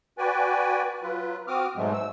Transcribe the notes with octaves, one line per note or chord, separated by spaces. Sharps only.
F#4 B4 D5 G5 G#5
F#3 F4 B4
C4 F#4 D6 D#6 F6
G#2 B2 F#3 G#3 A3
E6